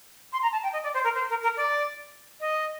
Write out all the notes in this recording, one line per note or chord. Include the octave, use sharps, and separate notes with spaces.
C6
A#5
A5
G5
D#5
D5
C5
A#4
C5
A#4
A#4
D5
D#5